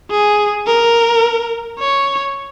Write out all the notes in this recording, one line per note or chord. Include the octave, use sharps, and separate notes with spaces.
G#4
A#4
C#5